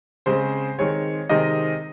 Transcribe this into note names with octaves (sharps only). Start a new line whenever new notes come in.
C#3 G#3 C4 C5
D#3 G#3 C4 C#5
C3 D#3 G#3 C4 D#5